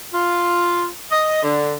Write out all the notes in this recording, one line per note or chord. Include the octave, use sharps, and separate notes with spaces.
F4
D#5
D3